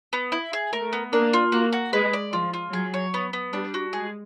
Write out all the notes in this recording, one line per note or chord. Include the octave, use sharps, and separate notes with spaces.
B3
E4
G#4
A3 A#4
B3
A#3 D4
F4
A#3 F#4
F#4
G#3 B4
D5
F3 F4
F4
F#3 G#4
C#5
B3
B3
G3 D4
F#4
G#3 G#4